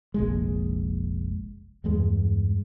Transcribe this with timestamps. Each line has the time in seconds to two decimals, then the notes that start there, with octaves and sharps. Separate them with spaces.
0.14 F1 A#1 G#3
1.84 E2 G2 G#3